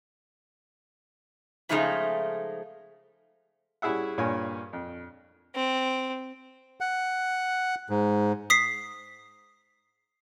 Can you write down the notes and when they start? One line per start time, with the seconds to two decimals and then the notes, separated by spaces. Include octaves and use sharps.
1.69 C#3 F3 G#3 A3 D#4 F4
3.82 G3 C#4 E4 G#4 E5 F#5
4.18 G2 A#2 F4 C#5 G#5
4.73 F2
5.55 C4
6.80 F#5
7.89 G#2
8.50 D#6 B6 C7